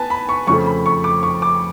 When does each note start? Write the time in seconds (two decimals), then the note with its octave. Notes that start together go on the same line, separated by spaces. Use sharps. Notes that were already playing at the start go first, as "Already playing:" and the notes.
Already playing: B3 B4 G#5 A5
0.10 B5
0.29 C#6
0.47 F2 C#3 F3 A3 C#6
0.66 B5
0.86 C#6
1.04 D6
1.23 C#6
1.42 D6